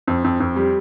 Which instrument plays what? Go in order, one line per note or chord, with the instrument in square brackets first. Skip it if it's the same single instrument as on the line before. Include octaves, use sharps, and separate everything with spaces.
[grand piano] F2
F2
F2
G3